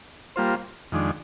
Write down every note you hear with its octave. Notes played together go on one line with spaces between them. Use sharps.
G3 A#3 F4 C5
F2 D#3 G#3 D4